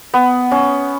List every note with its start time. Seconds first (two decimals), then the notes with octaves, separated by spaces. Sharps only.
0.14 B3
0.51 C#4